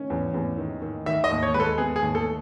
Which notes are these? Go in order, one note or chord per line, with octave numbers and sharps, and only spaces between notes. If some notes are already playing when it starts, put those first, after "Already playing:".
Already playing: D#3 C#4
E2
E2
D#3
D#3
D#3 E5
D#5
D#2
C#5
G#3 B4
A4
B3 G#4
G#4
D#2
A4